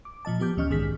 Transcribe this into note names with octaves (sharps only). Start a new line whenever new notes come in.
D6
A#2 F3 D#5 A5
F3 B3 G4 D6 G6
D2 E3 C#4 D#5 C#6 F6
B1 G#2 D#3 G#4 F6 B6